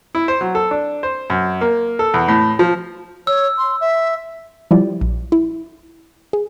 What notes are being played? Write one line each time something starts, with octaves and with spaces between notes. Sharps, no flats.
E4
C5
F#3
A4
D4
C5
F#2
A#3
A4
E2
A2
F3
C#5 E6
C6
E5
F3 G3 E4 F4 G4 D5
A#1
E4
G#4